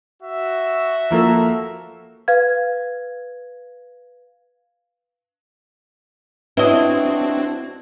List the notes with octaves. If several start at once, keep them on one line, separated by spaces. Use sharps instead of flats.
F#4 E5
F3 A#3 A4
B4 F5 G#6
C4 D4 E4 F#4 B4 C#5 D#5